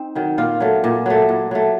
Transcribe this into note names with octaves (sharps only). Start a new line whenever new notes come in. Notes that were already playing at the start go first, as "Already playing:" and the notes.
Already playing: C4 D#4
D#3 F#3
A#2 F4
F#3 A3
A#2
F#3 A3
A#2
F#3 A3